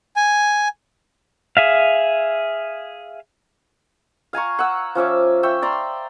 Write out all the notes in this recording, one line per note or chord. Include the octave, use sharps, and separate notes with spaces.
G#5
G#4 E5 F5
F5 G#5 A#5 C#6
F#5 E6
F3 C#4 E5 D6
E5 G5 C#6
D5 A#5 C6